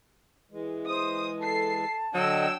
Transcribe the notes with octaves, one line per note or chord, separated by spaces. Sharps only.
E3 G#3
C5 D#6
A4 A5 C7
D3 F#3 D4 D#5 G5 E6